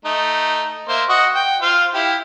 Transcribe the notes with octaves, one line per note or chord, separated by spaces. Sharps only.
A3 D#4
A#3 C5 E5
F#4 D#5 C#6
G5
F4 C5 F5
E4 G4 F5